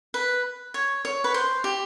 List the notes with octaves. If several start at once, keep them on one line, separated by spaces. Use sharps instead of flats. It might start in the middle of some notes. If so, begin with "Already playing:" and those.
B4
C#5
C#5
B4
C5
G4